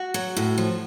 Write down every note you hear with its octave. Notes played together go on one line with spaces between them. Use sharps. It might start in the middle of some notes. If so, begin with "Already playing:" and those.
Already playing: F#4
F#3
A2
F3